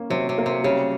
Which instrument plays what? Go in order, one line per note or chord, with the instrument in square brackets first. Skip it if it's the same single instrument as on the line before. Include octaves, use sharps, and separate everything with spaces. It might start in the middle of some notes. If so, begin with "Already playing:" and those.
Already playing: [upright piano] A#3 C#4
[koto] C3 [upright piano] F#3
[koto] C3
[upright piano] A#3
[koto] C3
[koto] C#3 [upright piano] G3